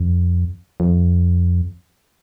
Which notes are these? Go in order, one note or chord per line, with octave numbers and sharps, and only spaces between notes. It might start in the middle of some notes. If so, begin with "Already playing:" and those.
Already playing: F2
F2